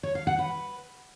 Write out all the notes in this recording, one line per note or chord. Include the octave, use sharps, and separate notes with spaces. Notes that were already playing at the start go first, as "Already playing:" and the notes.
C#5
F5
F#5
B4